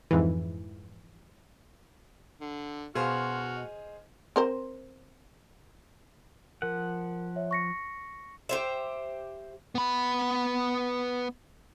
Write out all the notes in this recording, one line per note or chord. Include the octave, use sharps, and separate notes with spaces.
F2 G#2 E3
D3
B2 F#4 G#4 C5 F5 C6 F6
D#5
C4 A#4 C5
F3 A#4 F#5
C#5 E5
C#6 A#6 C#7
G4 C5 E5
B3 B5